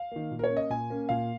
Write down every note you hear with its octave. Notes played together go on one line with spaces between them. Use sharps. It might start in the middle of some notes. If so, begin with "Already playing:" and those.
Already playing: F5
D#3 A#3
A#2
A#4
C#5
A#3 C#4
D#5
A#2 G#5
A#3 C#4
A#2 F5